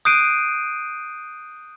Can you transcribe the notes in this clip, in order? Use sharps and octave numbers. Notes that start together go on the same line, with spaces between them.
D#6 F#6 G6 C7 D7 D#7